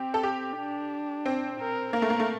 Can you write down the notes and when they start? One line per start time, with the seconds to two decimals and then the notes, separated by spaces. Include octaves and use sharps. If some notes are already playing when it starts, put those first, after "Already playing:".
Already playing: C4 G4
0.14 A4
0.23 G4
0.57 D4
1.26 C4
1.60 A#4
1.93 A#3 A#4
2.02 A3
2.10 A#3
2.20 A3